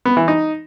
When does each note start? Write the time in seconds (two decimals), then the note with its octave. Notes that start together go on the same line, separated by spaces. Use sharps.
0.05 B3
0.17 E3
0.28 D#4